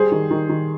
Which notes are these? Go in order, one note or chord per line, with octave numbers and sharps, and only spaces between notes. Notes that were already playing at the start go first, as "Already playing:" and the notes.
Already playing: G3 G#4 C5
D#3
D#3
D#3